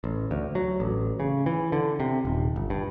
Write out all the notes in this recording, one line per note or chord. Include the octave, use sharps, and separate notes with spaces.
A1
D2
F#3
A1
C#3
E3
D3
C3
D#1
G1
G2